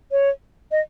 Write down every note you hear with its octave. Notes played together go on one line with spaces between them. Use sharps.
C#5
D#5